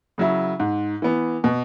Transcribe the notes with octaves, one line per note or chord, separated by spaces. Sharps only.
C#3 F#3 E4
G#2
E3 B3
B2